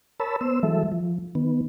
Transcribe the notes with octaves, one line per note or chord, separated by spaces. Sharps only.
A#4 C#5 A5 B5 E6
B3 C5 E6
E3 F#3 G#3 A4 E5
F3
D#3 B3